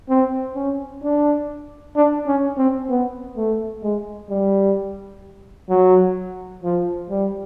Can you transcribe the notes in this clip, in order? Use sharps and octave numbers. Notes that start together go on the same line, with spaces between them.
C4
C#4
D4
D4
C#4
C4
B3
A3
G#3
G3
F#3
F3
G3